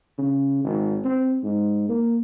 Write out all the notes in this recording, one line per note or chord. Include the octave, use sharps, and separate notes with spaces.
C#3
G#1
C4
G#2
A#3